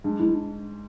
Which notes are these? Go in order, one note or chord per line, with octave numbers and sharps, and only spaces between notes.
G#2 D4
G#2 E4
D4